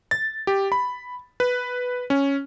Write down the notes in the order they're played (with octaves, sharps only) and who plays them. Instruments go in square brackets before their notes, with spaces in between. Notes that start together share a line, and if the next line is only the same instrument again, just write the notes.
[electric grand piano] A6
G4
B5
B4
C#4